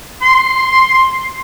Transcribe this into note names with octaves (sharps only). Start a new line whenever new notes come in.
C6